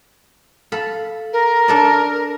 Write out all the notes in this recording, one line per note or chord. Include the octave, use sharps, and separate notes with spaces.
A4 F5 B5
A#4
D4 A4 D5